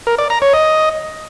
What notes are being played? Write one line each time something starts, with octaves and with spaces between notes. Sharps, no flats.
A#4
D5
A#5
C#5
D#5